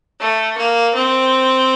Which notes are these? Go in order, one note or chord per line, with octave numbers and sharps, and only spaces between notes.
A3
A#3
C4